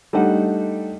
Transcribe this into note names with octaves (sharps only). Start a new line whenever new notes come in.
G3 A3 D4 D#4 F#5